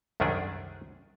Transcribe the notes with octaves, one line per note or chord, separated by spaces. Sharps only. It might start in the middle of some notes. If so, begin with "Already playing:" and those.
C2 F#2 D#3 A3 D4 G#4